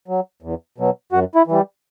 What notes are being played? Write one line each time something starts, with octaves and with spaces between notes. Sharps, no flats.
F#3
E2
B2 F#3
F#2 F#4
E4
E3 G3